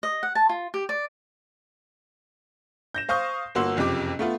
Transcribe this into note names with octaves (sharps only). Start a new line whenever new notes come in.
D#5
F#5
A5
F4
G4
D5
G6 A#6 E7
C5 F5 C#6 D#6 G6 C7
G1 A#3 F#4 C6 E6
F#1 F2 C3 G4 D6
A3 B3 F4